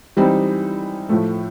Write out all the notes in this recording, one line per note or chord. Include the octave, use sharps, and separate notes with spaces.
E3 G3 C4 D#4
A2 F3 A3